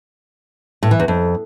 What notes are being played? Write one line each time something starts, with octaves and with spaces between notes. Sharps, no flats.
A2
E3
E2
F2